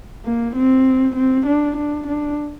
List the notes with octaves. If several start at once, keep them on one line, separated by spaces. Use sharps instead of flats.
A#3
C4
C4
D4
D4
D4